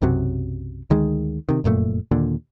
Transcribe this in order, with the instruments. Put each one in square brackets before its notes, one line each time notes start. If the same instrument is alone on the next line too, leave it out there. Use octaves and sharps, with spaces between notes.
[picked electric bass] B1 F#2 C3 F#3
D2 D#3 G#3
C3 D#3
F1 F#2 A#2 A3
D#2 A#2 D3